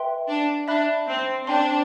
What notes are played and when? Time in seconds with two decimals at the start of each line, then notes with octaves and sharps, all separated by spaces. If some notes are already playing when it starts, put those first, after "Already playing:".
Already playing: B4 E5 G5 C6
0.28 D4
0.68 D4 E5 B5 F#6
1.08 C4
1.47 D4 C5 G5 C6